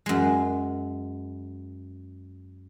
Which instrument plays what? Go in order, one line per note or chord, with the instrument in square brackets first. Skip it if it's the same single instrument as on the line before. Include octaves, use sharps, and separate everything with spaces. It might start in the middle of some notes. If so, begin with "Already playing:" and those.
[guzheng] F#2 G#3